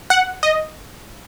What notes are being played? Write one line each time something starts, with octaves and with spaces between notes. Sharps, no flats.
F#5
D#5